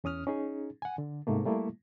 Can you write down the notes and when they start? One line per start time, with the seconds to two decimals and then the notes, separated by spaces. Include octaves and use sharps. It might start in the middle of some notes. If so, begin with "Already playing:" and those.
0.04 E2 C#4 D#6 F6
0.27 C#4 D#4 G#4
0.82 F#5 G#5
0.98 D3
1.27 G#2 C3 A3 A#3
1.45 G3 A3 A#3 E4